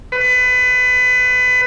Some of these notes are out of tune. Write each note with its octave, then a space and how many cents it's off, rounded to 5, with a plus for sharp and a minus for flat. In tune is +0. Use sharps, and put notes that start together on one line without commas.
B4 +25